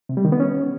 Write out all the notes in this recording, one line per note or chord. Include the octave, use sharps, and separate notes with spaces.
C3
G3
D#3
B3
C#4